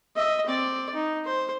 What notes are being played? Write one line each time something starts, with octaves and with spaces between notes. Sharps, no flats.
D#5 E5
C4 D5
D#4
C5